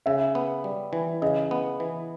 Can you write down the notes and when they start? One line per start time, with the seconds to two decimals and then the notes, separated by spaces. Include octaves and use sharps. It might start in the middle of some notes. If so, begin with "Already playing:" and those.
0.06 C#3 E5
0.35 B3
0.64 G3
0.93 E3
1.22 C#3 D#5
1.51 B3
1.80 E3